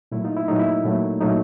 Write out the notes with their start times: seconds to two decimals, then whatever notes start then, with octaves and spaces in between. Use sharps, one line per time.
0.12 A#2 F#3 A3 E4
0.24 D#4 F4
0.36 E4
0.48 A#2 F#3 A3 D#4
0.59 E4
0.84 A#2 F#3 A3
1.20 A#2 F#3 A3 D#4